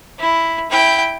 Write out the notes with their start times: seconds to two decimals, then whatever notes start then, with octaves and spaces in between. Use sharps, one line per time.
0.19 E4
0.70 E4 G5